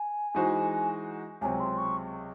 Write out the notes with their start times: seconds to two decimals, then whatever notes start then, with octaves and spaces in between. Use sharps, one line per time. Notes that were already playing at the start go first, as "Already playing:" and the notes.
Already playing: G#5
0.35 E3 G#3 D#4 F#4 C5
1.41 C#2 C3 F#3 C4 G#5
1.60 C6
1.78 C#6